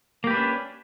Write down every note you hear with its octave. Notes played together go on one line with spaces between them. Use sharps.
A#3 C#4 D4 G4 B4